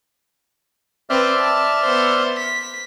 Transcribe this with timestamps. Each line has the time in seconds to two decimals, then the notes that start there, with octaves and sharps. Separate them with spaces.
1.10 C4 B4 D5 E5 F6
1.39 A5
1.85 B3 C5
2.37 B6